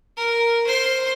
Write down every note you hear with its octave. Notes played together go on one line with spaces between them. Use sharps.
A#4
C5 C6